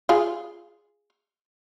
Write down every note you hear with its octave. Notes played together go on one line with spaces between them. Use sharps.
F4 G#4